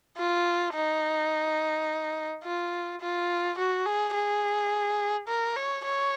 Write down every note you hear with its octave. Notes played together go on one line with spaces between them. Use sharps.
F4
D#4
F4
F4
F#4
G#4
G#4
A#4
C#5
C#5